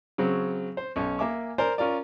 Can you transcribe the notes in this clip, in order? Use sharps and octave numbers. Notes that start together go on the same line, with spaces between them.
C#3 F#3 C4
C5
B1 C#4
A#3 E5 G#5 D6
A#4 C5 D5 G#5
C#4 F4 A#4 D5